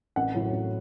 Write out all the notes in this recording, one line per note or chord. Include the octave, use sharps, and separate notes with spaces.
A1 F#5
A2 F#3
A1